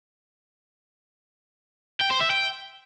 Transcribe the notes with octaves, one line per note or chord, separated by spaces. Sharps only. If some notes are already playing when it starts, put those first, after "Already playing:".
G5
C5
E5
G5